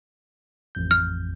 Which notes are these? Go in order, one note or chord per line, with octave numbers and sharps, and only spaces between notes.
A1 F2 G6
F6